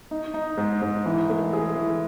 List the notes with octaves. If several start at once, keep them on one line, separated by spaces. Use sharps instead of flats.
D#4
D#4
G#2
G#2
E3
A3
G#4
E3